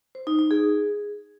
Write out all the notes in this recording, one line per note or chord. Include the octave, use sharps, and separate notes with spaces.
C5
D#4
D#4
G#4